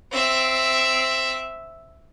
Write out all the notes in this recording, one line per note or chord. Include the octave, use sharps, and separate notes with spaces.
C4 E5